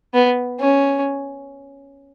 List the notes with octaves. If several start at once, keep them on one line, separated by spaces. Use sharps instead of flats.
B3
C#4